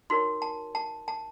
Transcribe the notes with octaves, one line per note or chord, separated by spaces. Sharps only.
D#4 F#4 A#4 C#5 C6
A5
A5
A5